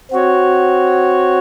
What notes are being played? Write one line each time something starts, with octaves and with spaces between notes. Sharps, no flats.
C4 F#4 C#5